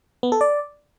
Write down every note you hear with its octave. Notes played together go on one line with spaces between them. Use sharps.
B3
A4
D5